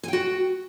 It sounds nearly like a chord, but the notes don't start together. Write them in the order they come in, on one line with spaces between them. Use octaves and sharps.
G#5 G5 F#4